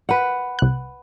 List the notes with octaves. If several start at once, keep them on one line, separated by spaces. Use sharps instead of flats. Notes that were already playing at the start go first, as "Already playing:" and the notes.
B4 F#5
C2 F#6